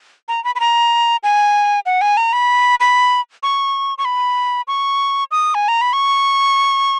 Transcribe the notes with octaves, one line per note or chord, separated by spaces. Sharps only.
A#5
B5
B5
A#5
G#5
F#5
G#5
A#5
B5
B5
C#6
C#6
B5
C#6
D#6
G#5
A#5
B5
C#6